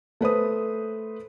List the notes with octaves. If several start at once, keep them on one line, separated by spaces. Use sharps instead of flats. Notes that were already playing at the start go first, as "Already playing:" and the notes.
A3 B4 C5 D#6